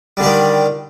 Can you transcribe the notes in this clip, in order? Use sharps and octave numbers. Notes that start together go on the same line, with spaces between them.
D3 D#3 G3 G4